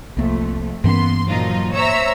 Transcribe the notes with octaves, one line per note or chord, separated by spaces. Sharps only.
C2 F2 A3 A#3
G2 E3 A#3 B3 C#4 C6
A#2 F3 F#3 D#4 F4
C5 C#5 E5 A#5 E6